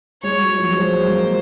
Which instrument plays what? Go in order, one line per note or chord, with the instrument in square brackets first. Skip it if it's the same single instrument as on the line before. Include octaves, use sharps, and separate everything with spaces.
[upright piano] G#3 [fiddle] C#5
[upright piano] F#3
F3
G#3
[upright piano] F#3 [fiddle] C5
[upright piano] G#3
A#3